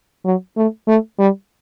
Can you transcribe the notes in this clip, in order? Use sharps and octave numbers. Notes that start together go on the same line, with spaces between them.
F#3
A3
A3
G3